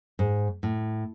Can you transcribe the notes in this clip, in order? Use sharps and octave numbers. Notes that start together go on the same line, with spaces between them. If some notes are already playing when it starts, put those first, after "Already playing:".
G#2
A2